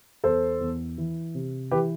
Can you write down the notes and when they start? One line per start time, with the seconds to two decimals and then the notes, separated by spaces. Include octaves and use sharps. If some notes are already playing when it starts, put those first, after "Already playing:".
0.24 E2 A4 C5
0.60 E2
0.98 E3
1.35 C3
1.71 E3 G4 B4